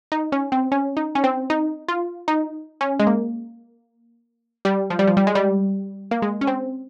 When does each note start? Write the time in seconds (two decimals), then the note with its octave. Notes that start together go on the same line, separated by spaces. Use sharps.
0.12 D#4
0.32 C#4
0.52 C4
0.72 C#4
0.97 D#4
1.15 C#4
1.24 C4
1.50 D#4
1.88 F4
2.28 D#4
2.81 C#4
2.99 G#3
3.07 A#3
4.65 G3
4.90 F3
4.99 G3
5.07 F3
5.17 G3
5.27 G#3
5.35 G3
6.11 A#3
6.22 G#3
6.41 C#4
6.47 C4